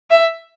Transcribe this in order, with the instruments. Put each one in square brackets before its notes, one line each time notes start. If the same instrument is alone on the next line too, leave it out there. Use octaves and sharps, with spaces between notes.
[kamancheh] E5